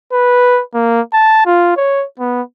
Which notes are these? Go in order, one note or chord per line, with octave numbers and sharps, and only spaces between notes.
B4
A#3
A5
F4
C#5
B3